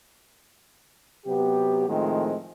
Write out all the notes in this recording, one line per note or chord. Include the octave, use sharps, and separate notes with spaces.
C3 F#3 B3 G4
A2 D#3 F3 G#3 A3 C4